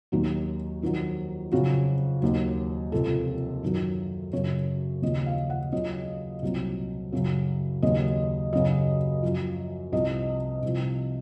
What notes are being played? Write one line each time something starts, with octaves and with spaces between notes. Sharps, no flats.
D#2 D#3 F#3 F#4
F2 D#3 F#3
F2 C#3 F#3 F#4
D#2 D#3 F#3
C#2 C3 F3 A4
F#2 D#3 F#3
F#2 C#3 F#3 C#5
D#2 C#3 F3 D#5
F5
F#5
C#2 C#3 F#3 D#5
C2 A#2 F#3
F#2 C#3 F#3
D#2 C#3 F#3 D#5
F#2 C#3 F#3 D#5
F#2 F3
C2 C3 F3 D#5
C2 C3 F3